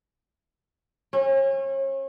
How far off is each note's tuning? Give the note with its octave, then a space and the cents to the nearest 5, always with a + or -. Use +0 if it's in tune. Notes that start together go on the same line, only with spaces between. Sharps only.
C#4 -35